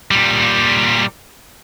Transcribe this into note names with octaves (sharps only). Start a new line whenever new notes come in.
A#2 G3